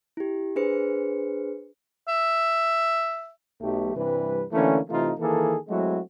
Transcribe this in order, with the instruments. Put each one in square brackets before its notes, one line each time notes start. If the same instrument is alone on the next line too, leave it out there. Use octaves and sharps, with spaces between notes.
[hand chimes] E4 G4
D4 G#4 B4 C5 C#7
[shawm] E5
[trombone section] B1 A3 G4
G2 C3 E3 G3 B4
D3 E3 A3 A#3 C#4
C3 E3 A3 D#4 F4
D#3 E3 A#3 G#4 A4
F#3 G#3 A3 C4 E4 F#4